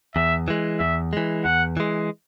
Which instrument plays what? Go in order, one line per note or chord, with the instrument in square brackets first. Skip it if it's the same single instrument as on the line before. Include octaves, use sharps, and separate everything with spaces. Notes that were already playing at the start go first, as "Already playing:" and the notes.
[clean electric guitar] E2 [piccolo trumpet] E5
[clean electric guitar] E3 G#3
[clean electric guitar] E2 [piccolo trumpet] E5
[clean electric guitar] E3 G#3
[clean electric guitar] E2 [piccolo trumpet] F#5
[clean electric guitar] E3 G#3